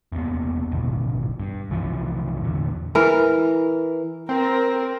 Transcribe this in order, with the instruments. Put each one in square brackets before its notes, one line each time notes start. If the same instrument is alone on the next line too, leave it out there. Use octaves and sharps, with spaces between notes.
[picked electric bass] F1 E2 A#3 B3
D1 G#1 B2
G2
C2 C3 E3 F3
E2 A#2 D3
[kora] E3 A#4
[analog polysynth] C4 [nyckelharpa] A#4